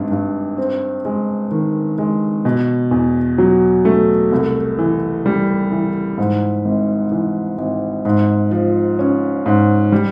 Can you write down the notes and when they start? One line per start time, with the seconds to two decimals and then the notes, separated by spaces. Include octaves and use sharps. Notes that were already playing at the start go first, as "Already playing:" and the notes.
Already playing: G#1 G2
0.12 G2
0.57 C4
1.05 G#3
1.51 D#3
1.98 G#3
2.45 B2
2.91 E2
3.38 F#3
3.85 A3
4.32 C2
4.79 E3
5.26 G3
5.72 E3
6.18 G#2
6.65 G#1
7.12 E3
7.58 G#1
8.05 G#2
8.51 F3
8.99 C#4
9.46 G#2
9.92 G3